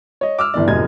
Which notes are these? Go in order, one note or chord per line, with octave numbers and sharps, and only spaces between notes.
C#5 D#5
D6 E6 F6
G1 E3 D5
F1 F#2 A2 D#5 G#6